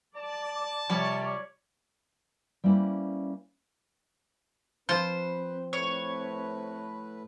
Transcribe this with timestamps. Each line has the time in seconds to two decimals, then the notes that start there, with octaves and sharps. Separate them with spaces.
0.16 D5 A5
0.90 C3 F3 G3 C#5 D5
2.64 G3 A#3 C#4 E4 B4 C5
4.89 F3 C4 F4 B4 C5
5.73 A2 A3 B4 C#5